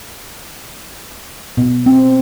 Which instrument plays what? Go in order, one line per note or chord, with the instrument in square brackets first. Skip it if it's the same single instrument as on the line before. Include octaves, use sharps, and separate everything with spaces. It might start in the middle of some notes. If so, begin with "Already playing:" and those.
[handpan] B2
C4